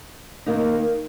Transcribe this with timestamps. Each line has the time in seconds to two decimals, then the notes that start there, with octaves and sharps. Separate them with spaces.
0.46 D#3 A#3 D#4